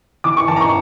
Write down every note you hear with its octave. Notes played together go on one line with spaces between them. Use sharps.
E3 D6
C#6
E3 A5
A#5
C#6